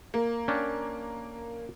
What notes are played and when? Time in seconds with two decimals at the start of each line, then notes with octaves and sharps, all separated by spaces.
0.14 A#3
0.48 C#4 D4 G5